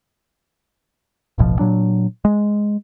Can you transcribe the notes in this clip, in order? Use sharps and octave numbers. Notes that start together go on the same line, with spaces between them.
D1 A1 B2 F3
A#2 F#3 D4
G#3